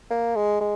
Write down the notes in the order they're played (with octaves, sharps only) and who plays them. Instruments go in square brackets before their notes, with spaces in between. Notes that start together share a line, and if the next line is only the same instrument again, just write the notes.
[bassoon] A#3
G#3
G#3